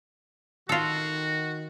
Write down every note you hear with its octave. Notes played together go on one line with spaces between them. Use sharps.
D#3 F4 F#4 A4